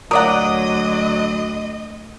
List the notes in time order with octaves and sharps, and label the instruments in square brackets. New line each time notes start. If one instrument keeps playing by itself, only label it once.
[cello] D2 D#5 [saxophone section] F#3 [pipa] A#4 D5 F#5 [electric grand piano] D6 D#6